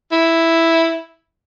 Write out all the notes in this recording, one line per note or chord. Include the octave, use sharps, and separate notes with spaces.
E4